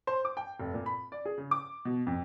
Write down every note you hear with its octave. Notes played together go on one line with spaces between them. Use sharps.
C5
D6
G5
F1
A#2
B5
D5
G#4
C#3
D6
B2
F2